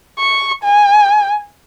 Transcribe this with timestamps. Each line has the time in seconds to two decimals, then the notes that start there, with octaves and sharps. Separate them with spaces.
0.19 C#6
0.64 G#5